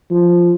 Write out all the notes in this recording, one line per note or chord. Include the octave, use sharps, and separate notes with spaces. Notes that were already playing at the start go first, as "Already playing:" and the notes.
F3